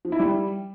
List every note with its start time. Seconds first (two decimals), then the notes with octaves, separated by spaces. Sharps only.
0.05 F3
0.12 E4
0.20 G3